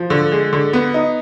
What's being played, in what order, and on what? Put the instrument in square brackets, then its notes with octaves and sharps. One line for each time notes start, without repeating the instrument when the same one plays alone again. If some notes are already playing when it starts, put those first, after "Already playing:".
Already playing: [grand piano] F3
D3
G#3
D3
B3
D#4